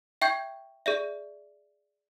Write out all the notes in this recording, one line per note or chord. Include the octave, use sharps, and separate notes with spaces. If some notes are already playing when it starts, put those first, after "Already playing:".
E5 G5 C#6 G6 G#6 C7
G#4 D5 E5